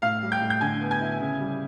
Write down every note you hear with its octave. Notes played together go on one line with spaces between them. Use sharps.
A2 F5 F6
G3
G5 G6
A2
G6
D3 G#5 G#6
B3
G#5 G#6
E4
C#3
G3